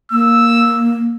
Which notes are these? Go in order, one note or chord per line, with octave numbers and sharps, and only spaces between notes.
A#3 E6